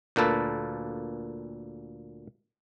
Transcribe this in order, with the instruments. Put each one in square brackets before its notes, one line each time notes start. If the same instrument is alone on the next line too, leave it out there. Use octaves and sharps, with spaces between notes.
[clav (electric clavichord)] D2 A#2 A#3 A4 B4